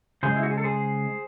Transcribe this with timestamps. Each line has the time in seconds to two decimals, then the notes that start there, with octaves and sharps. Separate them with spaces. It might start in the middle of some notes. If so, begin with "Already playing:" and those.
0.23 C#3 G#3 G#4 C5
0.36 E4
0.43 F#4
0.50 G#4
0.57 A4
0.64 G#4 C5